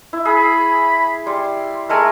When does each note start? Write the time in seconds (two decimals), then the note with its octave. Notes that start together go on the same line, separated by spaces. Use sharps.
0.13 E4
0.25 G#4 B5
1.27 G3 C6
1.89 G#3 A3 A#4 G#5